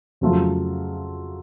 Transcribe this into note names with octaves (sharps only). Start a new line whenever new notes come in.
F2 C#3 F#3 A3 F4